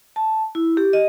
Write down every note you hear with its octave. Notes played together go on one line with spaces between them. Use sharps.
A5
E4
G4
D#5